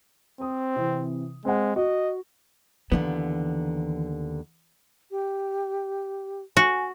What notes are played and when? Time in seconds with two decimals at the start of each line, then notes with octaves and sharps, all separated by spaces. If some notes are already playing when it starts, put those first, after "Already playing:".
0.40 C4 C5 D#6
0.76 C3 E3
1.45 G#3 C4 F#5
1.76 F#4 D#5
2.92 D#2 D3 E3 B3
5.11 G4
6.57 F#4 G#5